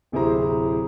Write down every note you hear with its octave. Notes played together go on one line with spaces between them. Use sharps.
D1 C3 E4 G#4 C5 A#5